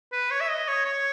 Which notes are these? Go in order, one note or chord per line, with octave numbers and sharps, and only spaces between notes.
B4
C#5
E5
D#5
C#5
C#5